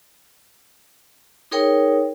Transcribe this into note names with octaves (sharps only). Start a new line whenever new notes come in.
D#4 G#4 A#4 C#5 G5